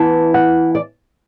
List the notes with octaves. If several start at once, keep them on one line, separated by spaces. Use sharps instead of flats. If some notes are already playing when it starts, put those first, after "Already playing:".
Already playing: E3 B3 E4 A5
F#5
D5